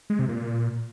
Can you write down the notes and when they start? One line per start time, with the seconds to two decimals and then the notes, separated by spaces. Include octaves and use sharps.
0.10 G#3
0.19 C3
0.29 A#2